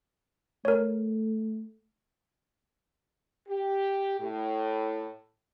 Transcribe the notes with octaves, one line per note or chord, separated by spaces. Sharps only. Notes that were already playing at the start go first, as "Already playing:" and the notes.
A3 A#4 C#5
G4
A2